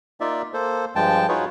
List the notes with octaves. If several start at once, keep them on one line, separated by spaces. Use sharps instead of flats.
A#3 D#4 F4 D5 E5
A#3 A4 C5
G2 F3 G#3 G5 A5
D#4 F4 F#4 G#4 B4 C#5